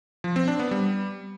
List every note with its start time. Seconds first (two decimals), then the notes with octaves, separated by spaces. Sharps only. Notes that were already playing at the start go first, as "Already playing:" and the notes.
0.24 F3
0.36 C4
0.48 D4
0.59 B3
0.71 G3